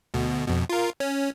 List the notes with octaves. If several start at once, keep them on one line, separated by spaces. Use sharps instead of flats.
D2 B2
F2 B2
F4 A#4
C#4